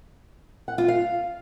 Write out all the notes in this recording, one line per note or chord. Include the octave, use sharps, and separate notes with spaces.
F#5
F4
F5